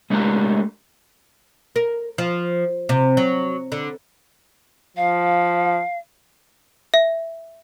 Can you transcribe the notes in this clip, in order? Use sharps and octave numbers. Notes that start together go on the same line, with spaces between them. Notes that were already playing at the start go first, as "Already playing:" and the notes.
G#3 A3 D4 F#4 G4 A#4
A#4
F3
C3
F#3
D3
F3 F5
E5